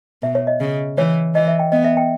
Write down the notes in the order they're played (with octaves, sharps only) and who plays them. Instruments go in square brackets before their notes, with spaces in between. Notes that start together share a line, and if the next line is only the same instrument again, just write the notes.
[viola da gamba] B2 [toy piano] E5
[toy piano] C#5
D#5
[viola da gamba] C#3
[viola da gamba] E3 [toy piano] C#5
[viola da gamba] E3 [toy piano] D#5
[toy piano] E5
G5
[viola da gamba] B3 [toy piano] D#5
[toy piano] E5
G5